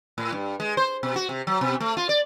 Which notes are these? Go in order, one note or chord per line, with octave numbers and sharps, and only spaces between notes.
A2
G2
G#3
C5
B2
F#4
C3
F#3
B2
A3
F4
D5